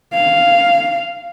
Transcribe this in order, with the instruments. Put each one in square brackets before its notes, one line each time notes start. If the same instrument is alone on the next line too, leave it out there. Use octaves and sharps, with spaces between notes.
[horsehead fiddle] F5